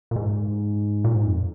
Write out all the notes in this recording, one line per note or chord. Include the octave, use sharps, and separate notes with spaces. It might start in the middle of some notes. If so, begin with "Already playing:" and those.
A#2
G#2
A#2
G#2
F2